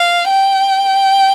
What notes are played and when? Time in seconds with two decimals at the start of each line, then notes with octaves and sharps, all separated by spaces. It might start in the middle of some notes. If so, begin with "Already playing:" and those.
Already playing: F5
0.30 G5